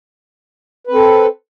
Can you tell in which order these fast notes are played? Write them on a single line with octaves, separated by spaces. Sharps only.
B4 C4 A4